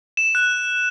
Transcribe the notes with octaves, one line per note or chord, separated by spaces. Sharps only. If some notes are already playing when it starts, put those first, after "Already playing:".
E7
F#6